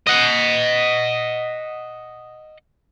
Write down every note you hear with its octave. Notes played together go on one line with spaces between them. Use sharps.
D#5 F#5